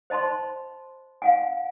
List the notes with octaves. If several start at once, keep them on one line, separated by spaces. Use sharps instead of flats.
C5 D#5 A5 B5 C6
F5 F#5 G#5